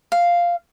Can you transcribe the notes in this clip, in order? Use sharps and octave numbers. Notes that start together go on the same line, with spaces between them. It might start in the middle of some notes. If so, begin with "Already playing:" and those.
F5